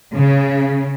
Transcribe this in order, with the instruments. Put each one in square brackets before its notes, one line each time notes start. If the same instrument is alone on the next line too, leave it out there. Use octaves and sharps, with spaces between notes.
[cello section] C#3